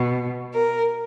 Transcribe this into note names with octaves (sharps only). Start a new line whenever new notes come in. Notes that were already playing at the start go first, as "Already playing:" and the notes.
Already playing: B2
A#4